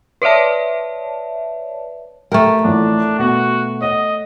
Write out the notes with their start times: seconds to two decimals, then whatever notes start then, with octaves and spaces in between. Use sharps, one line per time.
0.22 B4 C#5 D5 E5 A5
2.32 A3 A#4 F#5 G5
2.64 A1 F2 D4
3.19 B2 B3 F#4
3.81 C#5 D#5 F#5